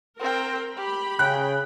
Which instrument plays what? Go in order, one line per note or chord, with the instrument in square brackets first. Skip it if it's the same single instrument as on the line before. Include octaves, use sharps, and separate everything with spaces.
[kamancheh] C4 G5 [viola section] A#4
[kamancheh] G4 [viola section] B5
[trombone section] C#3 [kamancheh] G5 [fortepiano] F#6